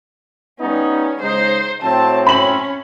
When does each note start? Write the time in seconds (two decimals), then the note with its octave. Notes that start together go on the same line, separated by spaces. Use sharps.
0.60 G3 B3 C#4 D#4
1.22 C#3 G#3 D#4 C5
1.83 A2 F#3 C4 A5
2.27 C#4 B5 F#7